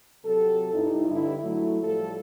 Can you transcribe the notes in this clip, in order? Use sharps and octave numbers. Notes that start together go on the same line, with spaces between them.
C3 F#3 G4 A4
G2 D#4 E4
G2 D3 E4
F#3 A3 E4
A2 F3 G3 F4 A4